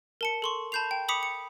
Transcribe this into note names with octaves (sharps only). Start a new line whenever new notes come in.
A#4 A5 C#7
A4 C6 C#6
A5 B5 G6 C7 F7
G5
B5 D6 D#6 B6 C#7 F7
C#7